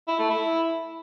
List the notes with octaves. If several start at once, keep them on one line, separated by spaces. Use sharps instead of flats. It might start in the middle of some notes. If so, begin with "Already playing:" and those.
E4
A3
E4